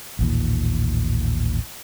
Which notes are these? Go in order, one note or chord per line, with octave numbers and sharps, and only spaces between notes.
A1 D#2 A#2